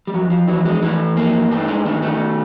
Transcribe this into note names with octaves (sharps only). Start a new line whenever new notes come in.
G3
F2 F#3
F3
E3 F#3
G#3
E3 A3
F2 A#3
G2 A3
G#3
D#3 A3
A3